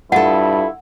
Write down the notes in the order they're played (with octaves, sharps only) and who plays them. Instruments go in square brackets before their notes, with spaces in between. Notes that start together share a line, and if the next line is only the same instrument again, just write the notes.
[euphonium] G2 [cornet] E4 [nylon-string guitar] F4 A4 [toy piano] F#5